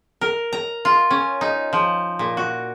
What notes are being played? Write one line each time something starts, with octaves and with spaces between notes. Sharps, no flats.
A#4
A#5
F4
C#4
D#4
F3
A#2
F#4